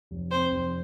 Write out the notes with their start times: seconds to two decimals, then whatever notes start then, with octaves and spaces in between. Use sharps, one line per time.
0.11 F1
0.31 C4 C5
0.51 F1